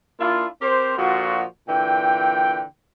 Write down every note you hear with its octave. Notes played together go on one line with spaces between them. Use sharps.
A#3 D4 E4 F4
C4 G4 A#4 C5
A#2 D3 F3 F#4
A#2 D3 E3 G5